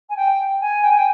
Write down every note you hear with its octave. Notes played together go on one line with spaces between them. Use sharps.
G#5
G5
G#5
G5
G#5
G5